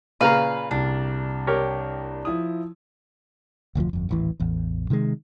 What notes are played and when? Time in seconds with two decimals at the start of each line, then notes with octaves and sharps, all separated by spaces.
0.21 A#2 C#3 B4 F5 A#5
0.71 C2 D4
1.47 G4 A#4 C#5
2.25 F3 E4 D#6
3.75 F1 D2 C#3 F3
3.93 G1 F2
4.09 D#1 A1 E3
4.40 A1 E2
4.90 C3 D#3 F#3 G#3